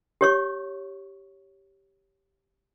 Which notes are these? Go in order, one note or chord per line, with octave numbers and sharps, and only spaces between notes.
G4 C#5 C#6